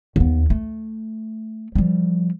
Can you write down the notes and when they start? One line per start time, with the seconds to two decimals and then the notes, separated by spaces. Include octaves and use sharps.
0.16 D#2 B3
0.50 A3
1.75 F3 G3